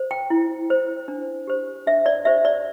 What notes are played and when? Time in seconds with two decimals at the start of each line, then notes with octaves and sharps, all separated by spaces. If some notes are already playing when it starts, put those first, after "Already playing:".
Already playing: C5
0.11 G5
0.30 E4
0.70 C5
1.08 D4
1.47 G4 C5
1.87 D4 E5
2.06 D5
2.25 G4 C5 E5
2.45 D5